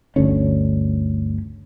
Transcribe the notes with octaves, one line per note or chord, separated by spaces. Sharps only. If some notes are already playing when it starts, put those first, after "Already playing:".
G1 D2 D3 C#4